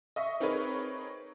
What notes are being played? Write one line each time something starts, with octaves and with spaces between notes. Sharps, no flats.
D#5 E5 C#6
C4 D#4 G#4 A#4 B4 C#5